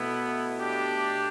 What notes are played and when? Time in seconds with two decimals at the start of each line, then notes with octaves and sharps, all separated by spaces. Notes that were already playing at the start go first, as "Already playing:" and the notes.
Already playing: B2 A3 B3 E4
0.59 D4 G4